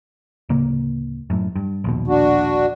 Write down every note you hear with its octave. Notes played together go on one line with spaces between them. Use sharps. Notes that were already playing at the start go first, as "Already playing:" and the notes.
D1 C#3 A#3
F#2 A2
G2
A#1 D#2 B2
D4 F#4